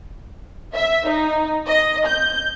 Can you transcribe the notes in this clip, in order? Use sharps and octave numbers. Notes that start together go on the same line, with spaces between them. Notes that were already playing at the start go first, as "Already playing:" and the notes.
E5
D#4
D#5
G6